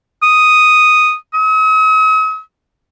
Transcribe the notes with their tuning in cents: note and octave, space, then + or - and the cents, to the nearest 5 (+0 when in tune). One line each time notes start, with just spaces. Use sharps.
D#6 +0
D#6 +45